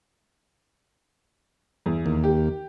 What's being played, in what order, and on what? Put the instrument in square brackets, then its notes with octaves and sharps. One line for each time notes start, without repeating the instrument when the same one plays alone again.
[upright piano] E2
[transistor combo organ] D#2
[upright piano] G4